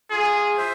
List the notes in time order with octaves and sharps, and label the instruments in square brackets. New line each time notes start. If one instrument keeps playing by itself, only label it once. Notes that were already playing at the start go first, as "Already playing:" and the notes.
[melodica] F4 [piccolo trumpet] G#4
[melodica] C5 E5